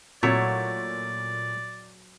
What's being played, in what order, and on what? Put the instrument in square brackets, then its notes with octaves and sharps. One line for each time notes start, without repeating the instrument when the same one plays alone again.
[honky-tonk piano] A#2 [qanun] F#3 [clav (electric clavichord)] A3 E4 C#5 [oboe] D5